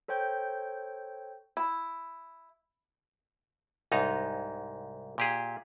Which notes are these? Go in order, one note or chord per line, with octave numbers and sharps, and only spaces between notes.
A4 C5 C#5 G5 G6
E4
C2 G#2 D#4 A#5
A#2 G4 G#4